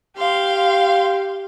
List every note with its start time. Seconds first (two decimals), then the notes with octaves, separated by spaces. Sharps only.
0.18 G4 F5 C6